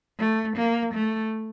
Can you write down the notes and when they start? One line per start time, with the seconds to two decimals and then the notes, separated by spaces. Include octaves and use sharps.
0.19 A3
0.57 A#3
0.95 A3